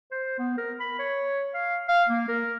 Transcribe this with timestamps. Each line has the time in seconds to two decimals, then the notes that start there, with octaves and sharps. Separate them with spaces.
0.11 C5
0.39 B3
0.57 A#4
0.80 B5
0.99 C#5
1.54 F5
1.88 F5
2.09 A#3
2.28 A#4